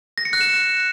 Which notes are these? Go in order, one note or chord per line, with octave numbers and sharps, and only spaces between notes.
A#6
C#7
F#6
E7